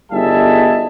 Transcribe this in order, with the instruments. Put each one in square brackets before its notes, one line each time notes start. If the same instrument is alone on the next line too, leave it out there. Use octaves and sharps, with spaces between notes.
[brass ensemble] G1 G3 D#4 G#4 E5 A5